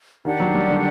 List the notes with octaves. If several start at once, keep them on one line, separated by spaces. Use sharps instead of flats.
D#3 D4 G4 D5 F#5
F#3
G3
D3